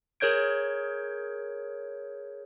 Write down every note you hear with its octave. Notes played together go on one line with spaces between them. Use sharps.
G#4 A#4 C#5 G6 G#6 D7